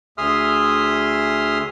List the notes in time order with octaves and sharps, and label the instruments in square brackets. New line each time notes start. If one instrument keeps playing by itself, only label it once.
[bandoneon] D2 G#4 E5 C6 D#6 F6